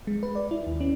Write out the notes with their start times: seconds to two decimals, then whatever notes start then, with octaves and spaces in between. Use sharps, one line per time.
0.07 G#3
0.23 B4
0.35 D5
0.51 E4
0.67 D#2
0.81 C#4